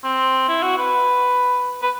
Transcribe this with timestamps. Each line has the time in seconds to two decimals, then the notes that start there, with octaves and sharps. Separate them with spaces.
0.04 C4
0.49 E4
0.63 F#4
0.78 B4
1.82 B4